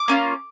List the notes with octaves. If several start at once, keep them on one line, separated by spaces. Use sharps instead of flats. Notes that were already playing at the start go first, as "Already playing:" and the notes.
Already playing: D6
A#3 C#4 F4